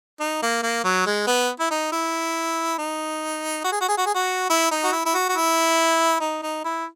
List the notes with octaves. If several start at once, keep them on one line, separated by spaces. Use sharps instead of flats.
D#4
A#3
A#3
F#3
G#3
B3
E4
D#4
E4
D#4
F#4
G#4
F#4
G#4
F#4
G#4
F#4
E4
D#4
F#4
E4
E4
F#4
F#4
E4
D#4
D#4
E4